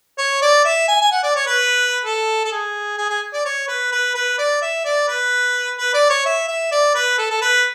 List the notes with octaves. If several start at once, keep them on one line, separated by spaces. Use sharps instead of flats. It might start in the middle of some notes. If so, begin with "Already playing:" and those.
C#5
D5
E5
G#5
G#5
F#5
D5
C#5
B4
A4
A4
G#4
G#4
G#4
D5
C#5
B4
B4
B4
D5
E5
D5
B4
B4
D5
C#5
E5
E5
D5
B4
A4
A4
B4